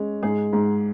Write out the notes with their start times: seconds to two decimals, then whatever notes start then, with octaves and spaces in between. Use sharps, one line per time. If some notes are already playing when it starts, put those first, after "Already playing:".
Already playing: G#3 C#4
0.22 G#2 G#4
0.53 G#2